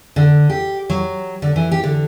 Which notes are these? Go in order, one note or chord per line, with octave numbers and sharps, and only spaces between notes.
D3
G4
F#3
D3
E3
G4
D3